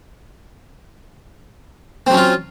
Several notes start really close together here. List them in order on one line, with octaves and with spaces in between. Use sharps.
C4 F#3 C#4 F4